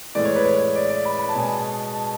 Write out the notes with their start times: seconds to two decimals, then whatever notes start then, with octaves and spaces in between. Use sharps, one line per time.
0.15 A2 E3 G#3 D5
0.25 C#5
0.36 B4
0.45 C#5
0.76 D5
0.90 D5
1.05 B5
1.19 B5
1.29 A5
1.35 B2 G#3 G#5
1.47 A5
1.94 A5